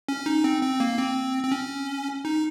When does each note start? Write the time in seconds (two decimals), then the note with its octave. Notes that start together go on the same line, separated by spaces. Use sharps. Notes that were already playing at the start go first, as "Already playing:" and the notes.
0.08 C#4
0.26 D#4
0.44 C4
0.63 C4
0.80 A#3
0.98 C4
1.43 C4
1.52 C#4
2.25 D#4